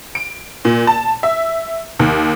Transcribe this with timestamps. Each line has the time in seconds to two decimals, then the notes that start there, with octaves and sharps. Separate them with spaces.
0.15 D7
0.65 A#2
0.87 A5
1.23 E5
1.99 D#2